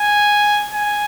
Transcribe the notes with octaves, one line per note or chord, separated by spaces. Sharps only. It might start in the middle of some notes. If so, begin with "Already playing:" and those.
Already playing: G#5
G#5